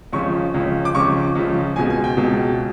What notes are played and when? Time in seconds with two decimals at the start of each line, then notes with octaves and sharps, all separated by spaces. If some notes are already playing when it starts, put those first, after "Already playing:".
0.12 C#2 C#3 F3 C#6
0.54 C#2 C#3 F3
0.85 D6
0.95 C#2 C#3 F3 C#6
1.35 C#2 C#3 F3
1.76 C#2 B2 G#3 G#5
1.90 G#5
2.04 G5
2.17 C#2 B2 G#3